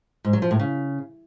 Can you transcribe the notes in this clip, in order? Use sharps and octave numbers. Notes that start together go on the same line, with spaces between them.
G#2
F#3
F3
A2
C#3